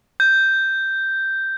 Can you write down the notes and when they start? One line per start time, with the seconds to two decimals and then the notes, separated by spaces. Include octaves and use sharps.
0.20 G6